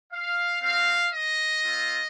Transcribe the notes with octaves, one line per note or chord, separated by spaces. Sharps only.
F5
C4 F#4 F5
D#5
C4 F4